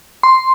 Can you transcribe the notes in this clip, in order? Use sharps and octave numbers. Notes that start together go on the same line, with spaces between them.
C6